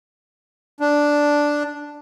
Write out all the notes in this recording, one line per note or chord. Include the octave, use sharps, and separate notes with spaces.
D4